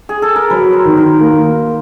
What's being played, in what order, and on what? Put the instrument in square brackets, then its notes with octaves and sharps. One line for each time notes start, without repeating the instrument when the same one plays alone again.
[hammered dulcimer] G#4
A4
A#4
[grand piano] F#3 [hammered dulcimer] B4
[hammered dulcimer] C5
[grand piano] D#3
[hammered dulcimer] A#4
[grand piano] A#3